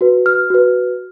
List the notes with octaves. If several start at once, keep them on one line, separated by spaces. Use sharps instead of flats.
F#4 B4
F6
F#4 B4